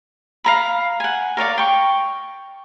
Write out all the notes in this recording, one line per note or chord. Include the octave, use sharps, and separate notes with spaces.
F5 A#5 B5
F#5 G#5
A#4 C#5 D5 F5
G5 C#6